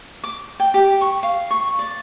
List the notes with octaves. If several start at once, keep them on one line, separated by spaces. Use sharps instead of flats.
D6
G5
G4
C#6
F5
C#6
D5